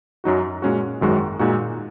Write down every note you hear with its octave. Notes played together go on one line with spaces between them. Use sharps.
F#2 F#3 D#4 F#4
A#2 G#3 C#4 F#4
G#1 F#2 D#3 G#3 F#4
A#2 G#3 D#4 F#4